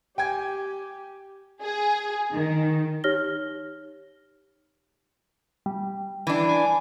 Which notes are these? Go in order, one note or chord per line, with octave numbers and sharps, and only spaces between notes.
G4 G5 G#5 G#6
G#4
D#3
D#4 G4 C#5 F6 A#6 G7
G3
E3 D4
G#5